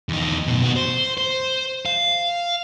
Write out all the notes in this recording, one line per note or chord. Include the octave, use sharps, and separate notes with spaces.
E2 D#4
F#2 B2
B3 F#4
C5
C5
F5